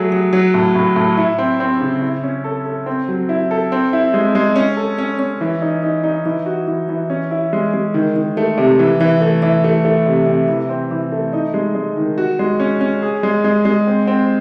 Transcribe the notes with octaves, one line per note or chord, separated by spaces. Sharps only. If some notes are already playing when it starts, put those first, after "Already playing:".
Already playing: F#3 A3 G#4
F#3
F#3
A2
A2
A2
E4
C4
C4
C#3
E4
C#4
A4
A4
C4
F#3
E4
A4
C4
E4
G#3
G#3
C#4
A4
C#4
C#4
E3
D#4
D#4
D#4
E3
F#4
E3
E3
C#4
E4
G#3
G#3
D#3
D#3
A3
C3
E3
E3
A3
E3
A3
A3
C3
C3
E3
C4
E3
A3
D#4
G#3
G#3
D#3
F#4
G#3
C#4
C#4
G#4
G#3
G#3
G#3
C4
C4